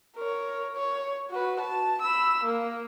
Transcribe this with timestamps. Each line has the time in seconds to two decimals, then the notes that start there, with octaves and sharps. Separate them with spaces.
0.16 A#4 C#5
0.76 C#5
1.31 F#4 B4
1.60 A5
2.01 B5 E6
2.44 A#3